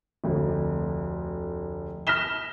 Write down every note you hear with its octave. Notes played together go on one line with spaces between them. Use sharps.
F1 D2
F6 A#6 B6 E7 G7